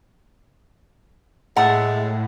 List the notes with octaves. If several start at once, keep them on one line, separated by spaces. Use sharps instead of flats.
A2 G#3 E5 F#5 A5